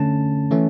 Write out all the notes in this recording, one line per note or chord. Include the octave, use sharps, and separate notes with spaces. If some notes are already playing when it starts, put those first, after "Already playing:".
Already playing: D3 A3 C#4 A5
E3 A3 C#4